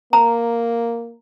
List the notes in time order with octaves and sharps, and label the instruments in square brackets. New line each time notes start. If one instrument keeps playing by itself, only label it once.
[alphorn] A#3 [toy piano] A#5